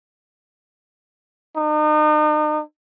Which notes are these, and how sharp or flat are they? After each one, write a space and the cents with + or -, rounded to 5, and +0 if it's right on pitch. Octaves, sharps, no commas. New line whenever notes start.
D#4 -40